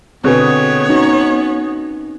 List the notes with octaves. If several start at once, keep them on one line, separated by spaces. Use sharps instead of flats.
B2 D3 B3 C4 G#4 B4 C#5
C#4 D#4 F#4